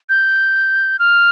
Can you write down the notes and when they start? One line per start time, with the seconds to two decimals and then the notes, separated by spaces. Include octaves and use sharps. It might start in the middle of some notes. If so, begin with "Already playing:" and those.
0.09 G6
0.99 F6